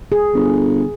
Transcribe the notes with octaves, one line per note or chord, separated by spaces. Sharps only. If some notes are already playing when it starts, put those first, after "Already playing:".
G#4
G1